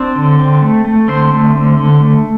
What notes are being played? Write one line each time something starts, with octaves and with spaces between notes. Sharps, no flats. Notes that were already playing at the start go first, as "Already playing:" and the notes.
Already playing: C4 D4 D5
D3
C4
A3
A3
D3 C4 C5
A3
D3
D3
A3